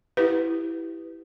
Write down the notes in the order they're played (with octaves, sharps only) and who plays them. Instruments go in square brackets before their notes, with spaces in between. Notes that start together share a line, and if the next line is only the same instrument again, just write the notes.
[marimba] E4 G4 [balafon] B4